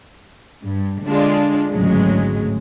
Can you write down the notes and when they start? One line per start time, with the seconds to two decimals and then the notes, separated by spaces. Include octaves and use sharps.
0.62 G2
1.06 D3 G#3 D4 F4
1.70 G#1 D2 A2 C#3 F#3 G#3